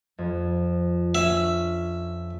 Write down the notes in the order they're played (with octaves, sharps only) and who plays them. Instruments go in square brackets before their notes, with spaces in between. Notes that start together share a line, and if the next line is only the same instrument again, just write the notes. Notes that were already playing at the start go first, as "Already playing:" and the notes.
[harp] F2
[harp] C#4 [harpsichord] E5